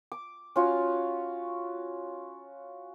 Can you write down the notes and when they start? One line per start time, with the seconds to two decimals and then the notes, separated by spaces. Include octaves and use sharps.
0.12 D6
0.56 C#4 F4 F#4